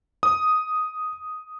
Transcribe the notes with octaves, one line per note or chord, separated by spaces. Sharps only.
D#6